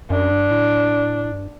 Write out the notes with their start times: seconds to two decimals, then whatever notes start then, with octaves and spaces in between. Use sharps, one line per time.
0.10 F#2 D4
0.31 G2
0.50 A2
1.32 G2